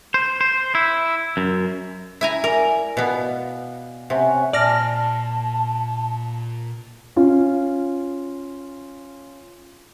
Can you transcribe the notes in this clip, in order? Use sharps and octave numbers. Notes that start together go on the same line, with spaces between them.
C5
C5
E4
F#2
E4 G#5 A#5
A#4 D5 G#5
B2 B3 F5 F#5
C3 C#4 F#5
A#2 D5 A5 F6 A#6
C#4 F4